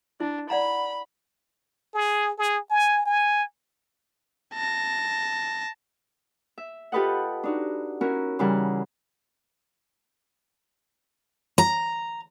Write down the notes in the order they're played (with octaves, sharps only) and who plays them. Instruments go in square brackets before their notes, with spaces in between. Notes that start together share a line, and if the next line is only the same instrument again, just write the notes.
[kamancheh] D4 [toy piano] E4
[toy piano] D5 F#5 A#5 [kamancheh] B5
[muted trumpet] G#4
G#4
G#5
G#5
[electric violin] A5 A#6
[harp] E5
F4 G4 A4 B4 D#5 F#5
D4 D#4 F#4
C#4 E4 F#4 A#4
C#3 E3 G3 A#4 F#5
[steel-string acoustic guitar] A#5